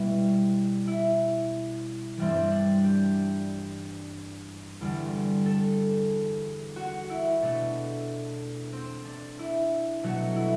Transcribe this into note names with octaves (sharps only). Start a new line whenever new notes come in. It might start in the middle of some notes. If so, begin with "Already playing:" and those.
Already playing: B2 G3 E4
E4
G2 E3 G3 C4
D4
C4
D4
G4
E2 D3 G3
A4
F#4
E4
B2 A3 D4
C4
D4
E4
B2 F#3 A3 F#4
E4